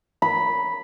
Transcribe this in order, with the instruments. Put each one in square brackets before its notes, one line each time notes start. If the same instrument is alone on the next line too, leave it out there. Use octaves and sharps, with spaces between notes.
[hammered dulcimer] B5